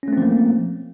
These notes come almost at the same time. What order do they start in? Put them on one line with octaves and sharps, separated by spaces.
C#4 A3 C4 F3 A#3